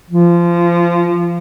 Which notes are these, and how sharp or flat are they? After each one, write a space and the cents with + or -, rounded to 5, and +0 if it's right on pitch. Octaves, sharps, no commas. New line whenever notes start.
F3 -20